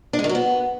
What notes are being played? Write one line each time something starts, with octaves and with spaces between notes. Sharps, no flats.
D4
G#3
D#3
F#3
B3